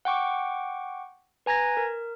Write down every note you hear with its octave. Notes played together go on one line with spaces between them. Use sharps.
F#5 G5 C#6 D6
B4 G#5 A#5 G#6 A#6
A#4